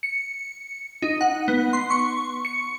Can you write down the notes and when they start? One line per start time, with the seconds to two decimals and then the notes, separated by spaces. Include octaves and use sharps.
0.03 C#7
1.02 D#4
1.21 F#5
1.48 B3
1.73 C6
1.90 C#6
2.45 C#7